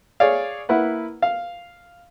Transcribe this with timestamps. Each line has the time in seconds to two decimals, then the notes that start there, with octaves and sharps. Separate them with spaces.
0.20 G#4 C#5 D5 F5
0.69 A#3 E4 B4 F#5
1.22 F5